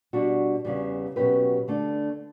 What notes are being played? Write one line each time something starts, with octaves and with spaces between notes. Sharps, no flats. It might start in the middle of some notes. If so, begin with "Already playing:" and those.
B2 G3 D4 F#4
E2 C#3 E3 G3
B2 F#3 C#4 G4 B4
D3 A3 D4